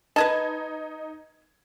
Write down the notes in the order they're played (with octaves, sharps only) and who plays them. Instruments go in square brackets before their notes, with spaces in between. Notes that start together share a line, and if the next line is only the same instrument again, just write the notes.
[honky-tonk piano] D#4 G#6 [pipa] B4 D#5 A5